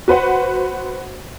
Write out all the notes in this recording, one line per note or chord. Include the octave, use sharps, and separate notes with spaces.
F#4 B4 C5 F#5